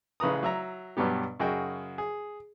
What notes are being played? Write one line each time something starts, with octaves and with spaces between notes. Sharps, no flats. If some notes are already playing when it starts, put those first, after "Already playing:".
A1 C#3 B4 A#5 D#6
F#3 E5 A#5
G2 B2 F#3 B3 G4
F#2 C#3 F#4 G#4 D#5 G5
G#4